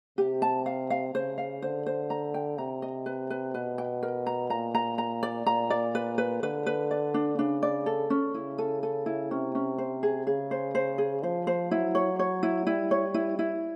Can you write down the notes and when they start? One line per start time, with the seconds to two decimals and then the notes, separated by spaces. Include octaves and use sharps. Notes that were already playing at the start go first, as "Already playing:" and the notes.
0.18 C3 G4
0.42 A5
0.66 F5
0.90 F5
1.14 C#3 C5
1.38 F5
1.62 D3 C5
1.86 C5
2.10 A#5
2.34 G5
2.58 C3 A#5
2.82 D#5
3.06 B4
3.30 B4
3.54 B2 B4
3.78 G5
4.03 A#4
4.26 A#5
4.50 A#2 A#5
4.75 A#5
4.98 A#5
5.23 D5
5.46 A#2 A#5
5.70 D5
5.95 B4
6.18 B4
6.42 D3 B4
6.66 B4
6.91 D5
7.14 D4
7.39 C#3 D4
7.63 D5
7.86 A4
8.10 C#4
8.34 C#3 E4
8.58 A4
8.83 A4
9.06 E4
9.30 C3 C#4
9.55 C#4
9.78 C5
10.03 G#4
10.26 C#3 G#4
10.51 C5
10.75 C5
10.98 G#4
11.23 F3 C5
11.47 C5
11.71 F#3 E4
11.95 C#5
12.19 C#5
12.43 E4
12.67 G3 E4
12.91 C#5
13.14 E4
13.39 E4